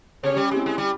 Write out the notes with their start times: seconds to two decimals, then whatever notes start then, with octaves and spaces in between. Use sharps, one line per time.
0.23 C#3 C#4 G4 C#5
0.37 G3
0.51 G#3 C4 E4 G4
0.66 G#3
0.78 G3